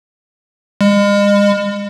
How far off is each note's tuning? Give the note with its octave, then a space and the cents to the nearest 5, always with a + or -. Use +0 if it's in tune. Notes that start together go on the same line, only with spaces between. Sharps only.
G#3 -40